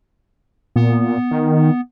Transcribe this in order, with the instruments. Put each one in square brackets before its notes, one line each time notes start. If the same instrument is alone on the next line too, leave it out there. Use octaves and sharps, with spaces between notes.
[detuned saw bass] A#2 [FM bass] B3
[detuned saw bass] D#3